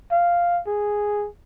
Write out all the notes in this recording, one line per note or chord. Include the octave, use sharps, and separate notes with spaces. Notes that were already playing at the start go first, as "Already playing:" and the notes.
F5
G#4